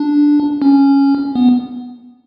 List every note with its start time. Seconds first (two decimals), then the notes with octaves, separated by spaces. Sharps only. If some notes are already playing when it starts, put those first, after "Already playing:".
Already playing: D4
0.62 C#4
1.35 B3